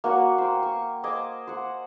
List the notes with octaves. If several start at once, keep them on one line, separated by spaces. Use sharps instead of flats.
A#3 F#4 C#5 F#5
C5 G5
C#6
C5 D#5 G#5 D6
C5 F#5